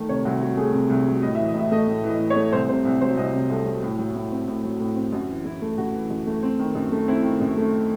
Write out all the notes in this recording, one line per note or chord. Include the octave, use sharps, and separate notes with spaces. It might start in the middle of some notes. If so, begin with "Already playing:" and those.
Already playing: D#3 A3
C3 C#5
C2 F#4
F#3 F#4
A3 G#4
C3
C2
F#3
A2 D#5
E3 E5
D#5
A2 E5
A3 D#5
A2
E3
D#5
A2
C#5
A3
C2 C5
C3 C5
C2
F#3 C5
C2 D#5
C3
C2 A4
F#3
A2
F#3
A2
C4
A2
F#3
A2
C4
F#2 F#4
E3
F#2 E4
A3
F#2 F#4
E3
F#2
A3
C4
D#3
F#2
A3
C4 E4
D#3
F#2
A3